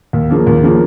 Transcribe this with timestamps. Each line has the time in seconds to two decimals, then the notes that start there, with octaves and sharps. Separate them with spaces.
0.13 D#2
0.30 C#3 F3 A#3
0.47 D#2
0.64 C#3 F3 A#3